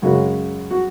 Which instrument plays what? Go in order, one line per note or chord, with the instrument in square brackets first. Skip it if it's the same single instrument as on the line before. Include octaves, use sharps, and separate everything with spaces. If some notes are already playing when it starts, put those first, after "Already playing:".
[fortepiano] F#2 C#3 G#3 F#4
F#4